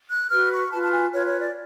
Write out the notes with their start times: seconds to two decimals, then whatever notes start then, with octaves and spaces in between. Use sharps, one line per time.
0.09 F#6
0.30 F#4 B4 F6
0.51 C#6
0.72 F4 B4 A5
0.83 A5
0.92 G#5
1.14 F4 B4 C#5
1.27 C#5
1.41 D5